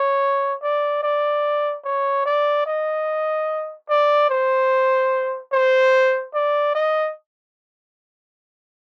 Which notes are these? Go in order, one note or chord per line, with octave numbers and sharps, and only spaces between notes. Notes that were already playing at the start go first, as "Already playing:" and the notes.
Already playing: C#5
D5
D5
C#5
D5
D#5
D5
C5
C5
D5
D#5